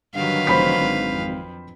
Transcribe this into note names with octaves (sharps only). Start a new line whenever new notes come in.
G2 D3 D#3 F#3 B4 F5
F1 C5 B5 B6
G#1
F2